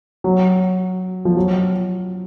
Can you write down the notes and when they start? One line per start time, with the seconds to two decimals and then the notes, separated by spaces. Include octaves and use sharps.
0.24 F#3
1.25 F3
1.37 F#3